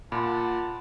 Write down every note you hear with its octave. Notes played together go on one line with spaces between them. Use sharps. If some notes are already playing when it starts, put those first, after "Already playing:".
A#2 F4 F#5 A5 B5 C6